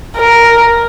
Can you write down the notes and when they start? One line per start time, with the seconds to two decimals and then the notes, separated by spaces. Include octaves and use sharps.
0.17 A#4